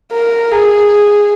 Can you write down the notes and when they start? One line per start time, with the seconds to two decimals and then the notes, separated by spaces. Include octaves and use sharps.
0.13 A#4
0.51 G#4